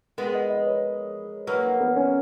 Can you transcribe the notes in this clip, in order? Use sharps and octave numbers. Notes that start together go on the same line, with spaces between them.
G#3 B3 A#4
D#5
D#5
B4
C#5
F#3 A#3 B4
A#4
B3
C#4